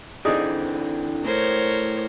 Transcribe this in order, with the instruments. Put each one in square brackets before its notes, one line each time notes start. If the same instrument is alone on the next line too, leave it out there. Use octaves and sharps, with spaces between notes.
[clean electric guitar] D3 E3 C4 [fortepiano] D#4 G#4 D5
[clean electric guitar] A2 [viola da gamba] A#4 C5 C#5